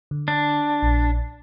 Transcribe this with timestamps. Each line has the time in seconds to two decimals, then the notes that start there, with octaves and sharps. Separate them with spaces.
0.11 D3
0.28 D4
0.83 A#1